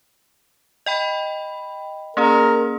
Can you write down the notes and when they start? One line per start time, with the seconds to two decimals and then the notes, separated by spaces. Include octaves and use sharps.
0.86 D#5 G5 B5
2.17 A#3 C#4 G#4 A#4